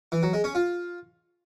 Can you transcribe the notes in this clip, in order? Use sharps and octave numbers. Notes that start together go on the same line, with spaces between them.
E3
F#3
G#3
C#4
F4